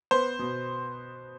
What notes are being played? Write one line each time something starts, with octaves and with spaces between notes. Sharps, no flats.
B3 C5
B2